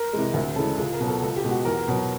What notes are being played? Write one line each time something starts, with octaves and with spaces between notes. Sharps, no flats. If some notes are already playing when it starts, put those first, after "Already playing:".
Already playing: A#4
C3 E3 G#3
D2 A#4
C#3 E3 G#3 A4
C#2 G#4
A#4
B2 F#3
A4
C#2 A4
G4
B2 G#3
F#4
E2 A#4
B2 F#3